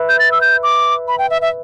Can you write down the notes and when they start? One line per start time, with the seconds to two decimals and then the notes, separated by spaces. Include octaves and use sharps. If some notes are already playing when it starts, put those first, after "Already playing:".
Already playing: B4 E5
0.09 G6
0.19 A6
0.32 E6
0.41 G6
0.63 D6
1.08 B5
1.19 G5
1.30 E5
1.42 E5